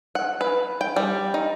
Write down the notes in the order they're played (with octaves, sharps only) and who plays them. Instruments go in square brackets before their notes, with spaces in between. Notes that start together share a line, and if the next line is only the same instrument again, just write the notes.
[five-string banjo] F#5
B4
G5
G3
D#4